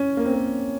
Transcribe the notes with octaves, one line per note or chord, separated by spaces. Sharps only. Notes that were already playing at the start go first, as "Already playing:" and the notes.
Already playing: C#4
A#3
C4
A#3